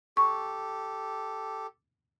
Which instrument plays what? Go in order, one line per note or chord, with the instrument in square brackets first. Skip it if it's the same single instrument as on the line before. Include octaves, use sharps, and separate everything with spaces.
[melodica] G4 A4 [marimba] C#6